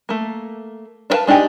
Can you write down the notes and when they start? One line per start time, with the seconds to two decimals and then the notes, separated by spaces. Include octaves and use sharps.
0.09 A3 A#3
1.10 D4 A#4 B4 F5 A5
1.27 G#3 D4 D#4 G4 G#5